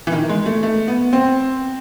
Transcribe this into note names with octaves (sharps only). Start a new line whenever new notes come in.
E3
D#3
G#3
A3
A3
B3
C4